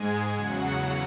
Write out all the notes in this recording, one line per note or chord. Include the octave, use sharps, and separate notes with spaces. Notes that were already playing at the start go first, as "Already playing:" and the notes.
Already playing: G#2 G#3 G#5
E2 C#3 F#3 F#5